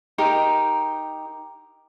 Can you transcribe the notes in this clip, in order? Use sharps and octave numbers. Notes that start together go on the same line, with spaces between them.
D#4 G4 A#4